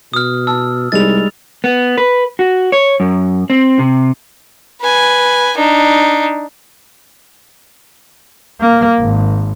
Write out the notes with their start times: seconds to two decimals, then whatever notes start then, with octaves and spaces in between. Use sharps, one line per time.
0.14 B2 D#6 F6
0.47 A5 E6
0.92 C2 G3 G#3 D#4 A6 F7
1.64 B3
1.98 B4
2.39 F#4
2.72 C#5
3.00 F#2
3.50 C4
3.79 C3
4.81 B4 G#5
5.57 D4 D#4
8.61 A#3
9.00 G#1